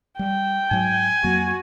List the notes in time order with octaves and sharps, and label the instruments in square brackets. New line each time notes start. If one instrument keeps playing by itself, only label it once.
[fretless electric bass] G3 [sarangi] G5
[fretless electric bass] G#2 F#3 [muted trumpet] G#5
[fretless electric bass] F2 F#3 A#3 [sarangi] F#4